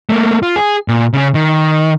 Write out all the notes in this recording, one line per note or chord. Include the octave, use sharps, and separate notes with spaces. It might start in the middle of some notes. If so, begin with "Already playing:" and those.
A3 A#3
F4
G#4
A#2
C#3 C#4
D#3